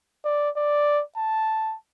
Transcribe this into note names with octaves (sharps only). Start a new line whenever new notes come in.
D5
D5
A5